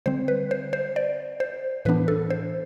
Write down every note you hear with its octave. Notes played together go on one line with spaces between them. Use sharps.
D3 G3 C4 C5
B4
C5
C5
D5
C5
A2 E3 B3 D4 B4
A4
C5